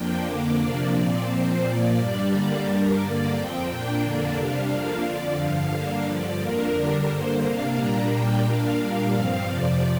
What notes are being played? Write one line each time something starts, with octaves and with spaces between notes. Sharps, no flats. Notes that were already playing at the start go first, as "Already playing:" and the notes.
Already playing: F2 F3 A#3 D4 G5
F2 D3 A#3 D4 D5
C3 F3 A#3 D4
A#2 F3 C4
A#2 F3 C4 C5
A#2 F3 A#3 D5
G2 G3 D4
D3 G3 A#3 D4 D5
G2 G3 D4 A#4
G2 D3 A#3 D5
F2 F3 C4 G5
A#2 A#3 D4 G5
F2 D3 A#3 D4 D5
C3 G3 D4 F5
F2 F3 A#3 D4 F5
F2 D3 F3 D5
G2 D3 F3 F5
G2 D3 A#3 D4 F5
G2 D3 F3 D5
F2 F3 A#3 D4 A#4
D3 G3 D4 A#4
G2 D3 A#3 C5
C3 A#3 D4 F5
A#2 G3 A#3 D4 A#5
A#2 G3 A#3 D4 G5
A#2 A#3 D4 F5
A#2 G3 A#3 D4
G2 F3 C4
F2 C3 F3 D5